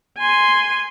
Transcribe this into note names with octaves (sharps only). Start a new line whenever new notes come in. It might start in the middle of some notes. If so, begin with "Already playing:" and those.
G#5 C6